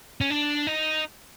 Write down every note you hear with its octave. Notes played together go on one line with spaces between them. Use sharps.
C#4
D4
D#4